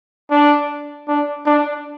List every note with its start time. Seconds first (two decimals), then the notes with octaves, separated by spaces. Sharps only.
0.31 D4
1.08 D4
1.46 D4